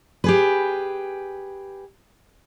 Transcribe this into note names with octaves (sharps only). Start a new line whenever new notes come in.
G4 G#4 B4